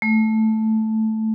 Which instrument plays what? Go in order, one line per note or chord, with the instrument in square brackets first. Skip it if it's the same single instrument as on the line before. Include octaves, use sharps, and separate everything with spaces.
[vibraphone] A3